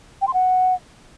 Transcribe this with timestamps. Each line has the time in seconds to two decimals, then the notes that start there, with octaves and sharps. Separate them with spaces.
0.21 G5
0.27 C6
0.33 F#5